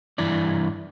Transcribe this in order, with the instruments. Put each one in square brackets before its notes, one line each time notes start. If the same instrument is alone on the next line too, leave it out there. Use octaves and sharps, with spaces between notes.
[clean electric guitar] G2 E3 E4 D5